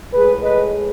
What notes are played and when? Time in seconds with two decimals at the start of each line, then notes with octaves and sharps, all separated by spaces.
0.13 A2 G#3 G#4 B4
0.42 B4 D#5